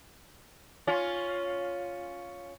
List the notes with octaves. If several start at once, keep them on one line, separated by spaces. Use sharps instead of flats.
C#4 F4